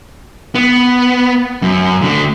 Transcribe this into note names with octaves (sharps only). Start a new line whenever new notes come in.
B3
F#2
D3 A3